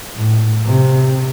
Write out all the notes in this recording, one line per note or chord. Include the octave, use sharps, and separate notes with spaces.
A2
C3